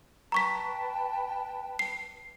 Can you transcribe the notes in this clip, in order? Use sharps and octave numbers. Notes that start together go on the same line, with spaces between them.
B4 G5 A5 A#5 C#6 B6
C7